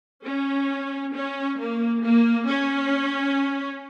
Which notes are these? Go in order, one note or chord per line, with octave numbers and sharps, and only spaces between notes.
C#4
C#4
A#3
A#3
C#4